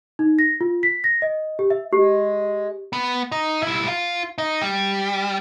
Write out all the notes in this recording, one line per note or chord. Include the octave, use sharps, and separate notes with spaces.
D#4
A#6
F4
B6
A#6
D#5
G4
E5
G#3 G4
B3
D#4
G3 E4
F4
D#4
G3